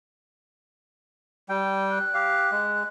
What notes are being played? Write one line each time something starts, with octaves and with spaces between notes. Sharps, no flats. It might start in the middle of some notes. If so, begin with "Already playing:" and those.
G3 G5
F#6
G4 F5
G#3